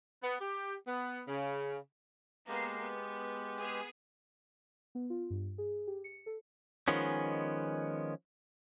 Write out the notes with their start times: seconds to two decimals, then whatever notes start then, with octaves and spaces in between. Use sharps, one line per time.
0.23 B3
0.40 G4
0.87 B3
1.28 C#3
2.48 G#3 A#3 B3 G4 C7
2.81 B3
3.60 B3 G#4
4.95 B3
5.10 F4
5.30 G2
5.58 G#4
5.87 G4
6.04 C#7
6.26 A4
6.88 D#3 F3 G#3 B3 C#4